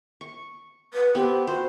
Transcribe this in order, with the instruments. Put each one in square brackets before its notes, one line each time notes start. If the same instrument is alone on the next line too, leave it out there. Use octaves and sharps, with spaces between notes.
[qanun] C#6
[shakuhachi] B4
[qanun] B3 C4 [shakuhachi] G4
[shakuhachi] F#4 [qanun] C5